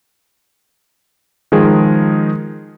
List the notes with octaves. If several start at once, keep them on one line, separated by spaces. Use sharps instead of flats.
D#3 F3 G#3 G#4 A#4